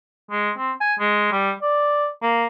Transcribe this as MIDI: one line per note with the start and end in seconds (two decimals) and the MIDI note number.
0.31 0.52 56
0.58 0.72 60
0.81 0.94 80
0.99 1.29 56
1.32 1.52 55
1.62 2.07 74
2.22 2.47 58